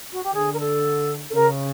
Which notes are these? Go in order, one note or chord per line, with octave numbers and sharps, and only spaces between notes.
F#4
G4
D3 G#4
A#4
A4
A4
C#3 A#4